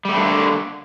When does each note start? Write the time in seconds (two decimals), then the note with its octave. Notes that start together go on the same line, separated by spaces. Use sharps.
0.05 G3
0.09 A3
0.13 D4
0.17 D3
0.20 A#3